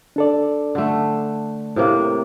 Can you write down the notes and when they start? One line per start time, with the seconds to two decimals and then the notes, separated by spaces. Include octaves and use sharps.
0.16 D4 A4 D5
0.75 D3 A3
1.76 A2 C3 A#3